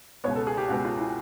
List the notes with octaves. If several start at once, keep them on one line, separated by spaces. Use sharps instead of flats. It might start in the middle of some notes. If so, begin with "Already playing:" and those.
C#2 B2 G#3 B3 C#5
A4
G#4
G4
C#2 B2 G#3 B3 F#4
F4
E4